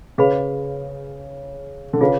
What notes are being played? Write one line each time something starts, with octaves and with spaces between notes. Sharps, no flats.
C#3 G#4 B4 F5 B5
D3
C#3 F4 G#4 B4 F5